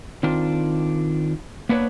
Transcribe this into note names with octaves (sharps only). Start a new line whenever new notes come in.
D#3 C4 D4 F4
A#3 B3 D4 B4 C#5